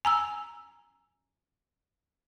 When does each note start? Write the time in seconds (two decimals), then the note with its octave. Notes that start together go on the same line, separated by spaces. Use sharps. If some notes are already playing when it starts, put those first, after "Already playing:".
0.05 G#5 A#5 E6